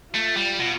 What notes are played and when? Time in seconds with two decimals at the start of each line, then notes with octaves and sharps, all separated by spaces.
0.14 A3 F4
0.37 G3
0.59 B2